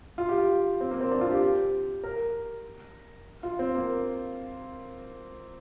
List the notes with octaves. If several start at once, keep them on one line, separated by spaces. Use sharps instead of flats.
F4
G4
F4
C4
A#3
C4
D4
F4
G4
A#4
F4
C4
A#3